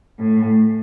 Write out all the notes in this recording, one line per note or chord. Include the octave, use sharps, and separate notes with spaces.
A2